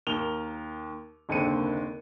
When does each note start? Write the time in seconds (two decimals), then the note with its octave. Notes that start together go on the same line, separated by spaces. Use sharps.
0.07 D#2 A#4 F7 G7
1.29 F#1 D#2 D3 C4 C#7 D#7